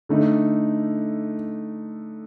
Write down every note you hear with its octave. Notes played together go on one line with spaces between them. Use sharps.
D3 A3 D#4